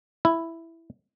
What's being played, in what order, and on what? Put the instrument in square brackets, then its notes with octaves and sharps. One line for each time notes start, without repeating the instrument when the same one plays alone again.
[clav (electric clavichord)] E4